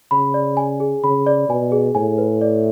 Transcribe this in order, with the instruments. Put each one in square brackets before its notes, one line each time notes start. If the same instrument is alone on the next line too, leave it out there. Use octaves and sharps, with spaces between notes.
[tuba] C#3 [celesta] B5
[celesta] D5
G#5
G#4
[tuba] C#3 [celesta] B5
[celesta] D5
[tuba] B2 [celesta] G#5
[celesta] G#4
[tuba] A2 [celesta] G#5
[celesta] B4
D5